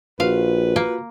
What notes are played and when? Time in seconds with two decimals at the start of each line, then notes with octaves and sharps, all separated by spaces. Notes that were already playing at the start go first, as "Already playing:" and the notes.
0.20 A#1 F4 F#4 B4 F5
0.76 A#3